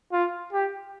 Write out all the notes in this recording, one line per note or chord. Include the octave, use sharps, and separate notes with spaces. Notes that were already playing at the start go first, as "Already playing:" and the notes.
F4
G4